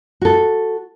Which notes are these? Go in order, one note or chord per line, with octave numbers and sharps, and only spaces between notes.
F#4 A4